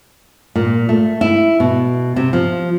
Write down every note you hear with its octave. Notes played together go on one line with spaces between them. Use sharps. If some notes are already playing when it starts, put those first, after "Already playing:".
A#2
A3
E4
B2
C3
F3